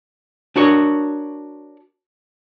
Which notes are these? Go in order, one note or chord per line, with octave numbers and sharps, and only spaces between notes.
D4 F#4 A#4 C#5